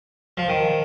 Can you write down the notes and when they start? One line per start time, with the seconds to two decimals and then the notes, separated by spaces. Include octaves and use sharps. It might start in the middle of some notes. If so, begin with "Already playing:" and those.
0.37 F3
0.48 D#3